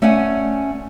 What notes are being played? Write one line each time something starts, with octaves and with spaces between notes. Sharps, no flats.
A3 C#4 D5 F#5 G#5